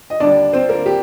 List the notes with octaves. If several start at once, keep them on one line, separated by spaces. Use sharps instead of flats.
D#5
D#2 D3 G3 D4 D5
C4 C5
A#3 A#4
G4